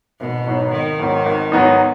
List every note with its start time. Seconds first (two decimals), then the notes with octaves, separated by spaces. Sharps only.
0.20 G#1 B2
0.46 G#2 F#3 B3 D#4
0.73 G#1 D#3
0.99 G#2 F#3 B3 D#4
1.26 G#1
1.52 G#2 F#3 B3 D#4